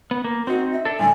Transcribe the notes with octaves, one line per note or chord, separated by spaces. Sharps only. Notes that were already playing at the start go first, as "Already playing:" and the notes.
B3
A#3
C4 D#4 F#4
E5
D4 A4
A2 D3 G3 G#5